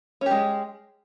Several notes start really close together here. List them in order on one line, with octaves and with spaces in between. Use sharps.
C#4 G4 G#3